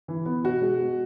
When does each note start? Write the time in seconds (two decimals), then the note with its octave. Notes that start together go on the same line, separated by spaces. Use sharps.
0.08 E3
0.25 B3
0.43 B2 F#4
0.62 G#3
0.80 B2